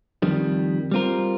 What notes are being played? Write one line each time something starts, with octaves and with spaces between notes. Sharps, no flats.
F2 D#3 G3
G3 C4 F4 A#4